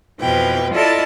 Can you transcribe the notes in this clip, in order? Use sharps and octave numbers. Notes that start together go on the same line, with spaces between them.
F2 B2 E3 F3 B4 G5
E4 F4 A4 D5 D#5 A5